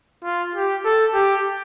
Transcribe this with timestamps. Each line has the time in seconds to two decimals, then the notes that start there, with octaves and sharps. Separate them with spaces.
0.24 F4
0.55 G4
0.85 A4
1.14 G4